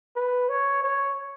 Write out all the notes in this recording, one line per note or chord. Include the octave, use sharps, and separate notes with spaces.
B4
C#5
C#5